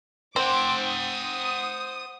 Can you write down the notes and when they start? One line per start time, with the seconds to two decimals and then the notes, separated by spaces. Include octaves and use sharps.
0.36 C4 C5 F#5 D6
0.87 D#6